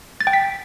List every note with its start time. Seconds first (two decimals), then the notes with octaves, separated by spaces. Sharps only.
0.21 A6
0.27 G5
0.33 B6